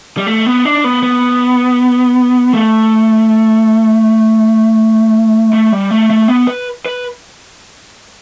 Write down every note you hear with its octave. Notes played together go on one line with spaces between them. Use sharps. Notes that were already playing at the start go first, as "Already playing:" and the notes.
G3
A3
B3
D4
B3
B3
A3
A3
G3
A3
A3
B3
B4
B4